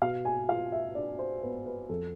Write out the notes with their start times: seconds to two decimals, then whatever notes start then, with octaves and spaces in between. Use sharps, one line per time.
0.02 B2 F5
0.25 G#5
0.48 F4 F5
0.72 E5
0.95 D4 D5
1.19 C5
1.43 B3 B4
1.66 B4
1.89 F2 A4